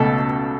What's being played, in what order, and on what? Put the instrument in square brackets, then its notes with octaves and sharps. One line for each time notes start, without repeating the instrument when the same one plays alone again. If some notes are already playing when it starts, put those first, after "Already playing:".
Already playing: [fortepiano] C#2 B2 A3 A4